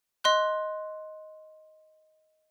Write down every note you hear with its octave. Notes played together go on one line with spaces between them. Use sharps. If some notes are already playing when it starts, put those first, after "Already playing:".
D#5 C6 F#6